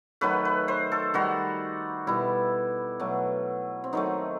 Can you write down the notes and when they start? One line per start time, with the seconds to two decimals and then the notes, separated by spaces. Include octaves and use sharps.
0.21 D#3 F#3 A3 B4
0.45 B4
0.68 C5
0.92 A4
1.14 D#3 G3 F#4
2.07 B2 G3 E4
3.00 B2 F#3 A3
3.84 C4
3.93 D#3 F#3 A3 D#4